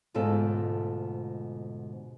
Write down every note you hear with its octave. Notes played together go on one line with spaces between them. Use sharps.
D2 G#2 B2 F4 A4